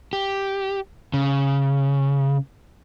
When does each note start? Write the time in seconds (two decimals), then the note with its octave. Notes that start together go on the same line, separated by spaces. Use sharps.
0.13 G4
1.14 C#3